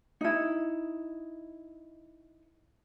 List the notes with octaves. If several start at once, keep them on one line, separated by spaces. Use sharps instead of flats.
D#4 E4